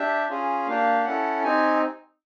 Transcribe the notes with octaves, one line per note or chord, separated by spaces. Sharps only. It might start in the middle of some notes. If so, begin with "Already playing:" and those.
Already playing: D4 G4 E5
C#4 F4 G#4
A#3 D4 G4 F5
C#4 E4 A4 F#5
C4 D#4 G4 G#5